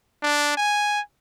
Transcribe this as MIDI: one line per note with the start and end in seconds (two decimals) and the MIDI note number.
0.22 0.56 62
0.57 1.00 80